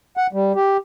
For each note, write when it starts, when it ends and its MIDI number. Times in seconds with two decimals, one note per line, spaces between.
0.17 0.27 78
0.33 0.52 55
0.55 0.77 67